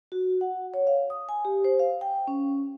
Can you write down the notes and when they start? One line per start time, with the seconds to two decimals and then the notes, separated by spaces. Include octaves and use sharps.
0.12 F#4
0.41 F#5
0.74 C#5
0.87 F5
1.10 D#6
1.29 G#5
1.45 G4
1.64 C5
1.79 F5
2.01 G5
2.28 C#4